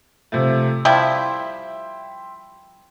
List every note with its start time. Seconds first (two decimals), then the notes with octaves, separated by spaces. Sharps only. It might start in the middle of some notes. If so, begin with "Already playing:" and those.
0.32 C3 F3 A3
0.85 F3 G3 E4 E5 G5 C6